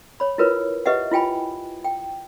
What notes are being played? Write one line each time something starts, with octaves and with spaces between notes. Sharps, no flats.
C#5 B5
E4 F4 A#4 B4 C#5
G4 B4 D#5 E5 F#5
E4 F4 G5 G#5 B5
G5